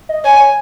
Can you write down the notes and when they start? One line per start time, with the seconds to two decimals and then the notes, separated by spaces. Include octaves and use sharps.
0.09 D#5
0.24 C#5 G#5
0.39 C#5